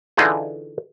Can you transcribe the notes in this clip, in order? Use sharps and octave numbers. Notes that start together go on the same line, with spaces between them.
D3 E3 D#4 F4 G#4